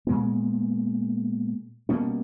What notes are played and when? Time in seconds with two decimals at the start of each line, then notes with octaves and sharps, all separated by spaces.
0.07 A#2 G#3 B3
1.89 B2 G3 A#3 C#4